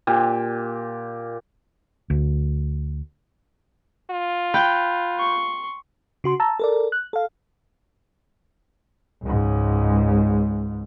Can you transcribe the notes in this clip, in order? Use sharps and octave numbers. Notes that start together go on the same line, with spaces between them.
A#2 G4
D2
F4
G5 B5 F#6 G6
C6 C#6
C#3 F#4 C6
A5 A#5 E6
A4 A#4 D5
F#6
A4 F5
C#2 G#2